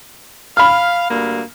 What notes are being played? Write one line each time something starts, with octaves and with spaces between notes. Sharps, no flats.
F5 B5 F6
D2 G2 A#3